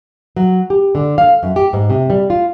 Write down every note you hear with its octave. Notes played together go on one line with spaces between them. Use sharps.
F#3
G4
D3
F5
F#2
G4
G#2
C3
G3
F4